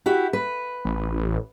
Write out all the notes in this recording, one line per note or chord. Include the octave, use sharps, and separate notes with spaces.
E4 F#4 G4
B4
A1